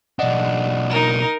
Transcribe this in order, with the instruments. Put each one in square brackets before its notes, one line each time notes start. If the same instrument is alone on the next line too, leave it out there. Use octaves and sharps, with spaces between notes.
[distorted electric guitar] B1 D4 [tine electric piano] D5 D#5 F#5
[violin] D#4 A#4